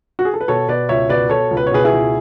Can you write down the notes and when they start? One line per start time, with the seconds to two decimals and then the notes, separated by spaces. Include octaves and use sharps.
0.19 F#4
0.25 G#4
0.34 A4
0.41 B4
0.48 B2 A4 C#5
0.68 B2 B4 D5
0.89 C#2 C#5 E5
1.09 B2 B4 D5
1.29 B2 A4 C#5
1.51 C#2
1.57 B4
1.67 C#5
1.71 B2 G#4 B4
1.84 E4 G#4
1.92 C#2